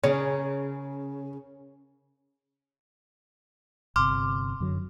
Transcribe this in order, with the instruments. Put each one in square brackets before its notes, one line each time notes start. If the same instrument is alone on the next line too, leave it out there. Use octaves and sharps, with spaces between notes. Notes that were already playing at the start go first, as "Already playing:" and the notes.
[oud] C#3 [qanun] C#4 G#4 A#4 [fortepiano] C#5
[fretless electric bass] G1 C3 [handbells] C6 D6 F6
[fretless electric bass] F#2 D3 F#3